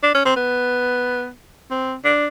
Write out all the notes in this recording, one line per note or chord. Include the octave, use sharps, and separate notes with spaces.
D4
C#4
C4
B3
C4
D4